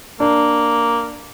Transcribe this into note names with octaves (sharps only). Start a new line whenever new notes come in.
A#3 D4